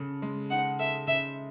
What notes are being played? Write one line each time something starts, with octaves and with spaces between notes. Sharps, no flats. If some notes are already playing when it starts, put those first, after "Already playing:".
Already playing: C#3 A4
G#3
D#4 F#5
A4 E5
C#3 E5